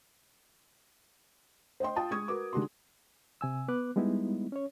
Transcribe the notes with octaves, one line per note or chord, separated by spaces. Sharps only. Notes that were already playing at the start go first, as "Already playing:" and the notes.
C5 D#5 G5 C6
F4 G5 A5 D#6
G#3 C#6 D#6 G#6
F#4 A#4 B4 D6
D#3 G#3 D4 F#4 G4 C6
C3 G#5 E6
B3 B4 D6 F#6
G3 G#3 B3 D#4 E4
C#4 C#5